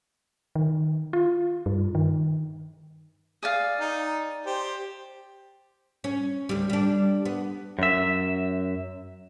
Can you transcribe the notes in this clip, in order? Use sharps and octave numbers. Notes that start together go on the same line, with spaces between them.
D#3
F4
G2
D#3
G#4 D5 F5
D#4
G4 C5
C#4
D2 G3
G3 D4
B3
F#2 E5